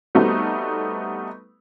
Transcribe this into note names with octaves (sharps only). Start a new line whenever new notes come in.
G3 A3 B3 C4 D#4 F#4